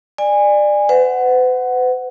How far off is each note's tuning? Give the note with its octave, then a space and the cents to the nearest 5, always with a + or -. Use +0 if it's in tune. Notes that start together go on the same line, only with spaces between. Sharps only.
D5 +25 G#5 -20
B4 +45 F#5 +0